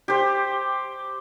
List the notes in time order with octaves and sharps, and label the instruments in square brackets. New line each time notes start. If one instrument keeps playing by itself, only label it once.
[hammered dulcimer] G4 C5